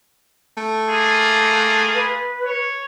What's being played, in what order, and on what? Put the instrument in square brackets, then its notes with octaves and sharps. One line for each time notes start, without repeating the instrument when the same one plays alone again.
[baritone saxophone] A3
[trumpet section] A#3 F4 G#4
[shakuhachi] B4
[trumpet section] C#5